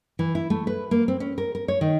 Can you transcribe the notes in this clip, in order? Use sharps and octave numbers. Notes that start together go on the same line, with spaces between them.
E3
E4
A3
B4
A#3
C4
C#4
A#4
A#4
C#5
D#3